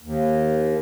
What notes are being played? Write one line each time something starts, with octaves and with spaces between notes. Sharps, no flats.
D#2